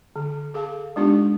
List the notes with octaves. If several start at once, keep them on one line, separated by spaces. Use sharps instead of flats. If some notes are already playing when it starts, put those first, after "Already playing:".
D3
G#4 A4 F5 A5
G#3 B3 D4 D#4 F4 G4